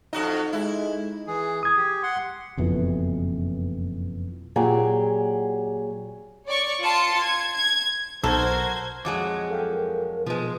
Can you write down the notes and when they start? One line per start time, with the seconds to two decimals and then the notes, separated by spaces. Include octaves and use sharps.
0.13 F2 D#4 F#4 A4 D#5
0.53 G#3 E4
1.27 E3 G#4
1.63 D#6 G#6
1.76 G4
2.03 F#5 C6
2.58 F#1 F2 B2 E3
4.56 A#2 F#3 G4 G#4 A#5
6.47 C#5 D5 C#6
6.83 F4 A5 C6 C#7
7.21 G#6
7.53 G#6
8.24 B1 F#4 A4 A#4 C5 G#6
9.05 F2 F#3 G#3 D6
9.51 A4 F5 G5
9.68 A#4
10.26 B2 F3 G#3 B4